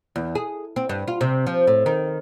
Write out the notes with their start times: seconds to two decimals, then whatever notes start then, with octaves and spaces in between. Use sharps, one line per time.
0.16 E2
0.35 G#4
0.76 C4
0.89 G2
1.08 F4
1.21 C3
1.47 F3
1.67 A2
1.86 D#3